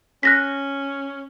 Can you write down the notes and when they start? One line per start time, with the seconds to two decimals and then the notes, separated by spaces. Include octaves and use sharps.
0.23 C#4 F#6 A#6 B6